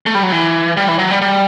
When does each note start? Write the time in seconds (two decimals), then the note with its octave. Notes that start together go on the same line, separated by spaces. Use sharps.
0.06 A3
0.15 G3
0.23 F#3
0.32 E3
0.77 G3
0.88 E3
0.99 F#3
1.11 G3
1.21 G3